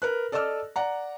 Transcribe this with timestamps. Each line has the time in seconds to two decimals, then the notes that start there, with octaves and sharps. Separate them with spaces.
0.02 A#4 B4 F#6
0.32 A4 D5 D#5 D6 E6 F6
0.76 D5 F#5 A#5